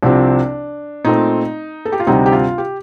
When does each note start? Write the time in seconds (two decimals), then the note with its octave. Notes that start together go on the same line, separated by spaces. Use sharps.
0.03 C2 C3 F3 C4 D4
1.05 A#2 A3 C4 D#4
1.85 A4
1.92 G4
2.00 F4
2.07 D2 C3 G3 C4 D#4
2.26 G4
2.32 F4
2.58 G4